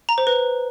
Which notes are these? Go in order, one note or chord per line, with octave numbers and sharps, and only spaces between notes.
A#5
C5
B4